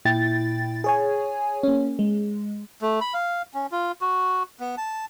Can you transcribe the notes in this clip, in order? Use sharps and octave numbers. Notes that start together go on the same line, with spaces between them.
A#2 E4 G5 A6
G#4 C#5 G#5
A#3 C#4
G#3
A3
B5
F5
C#4
F4
F#4
B3
A5